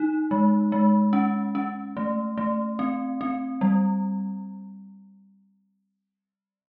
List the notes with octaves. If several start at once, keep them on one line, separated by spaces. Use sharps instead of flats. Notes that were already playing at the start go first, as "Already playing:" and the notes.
Already playing: D#4
G#3
G#3
C#4
C#4
A3
A3
C4
C4
G3